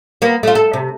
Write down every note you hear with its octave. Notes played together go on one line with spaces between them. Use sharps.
A#3 B3
A3 F4
A4
C3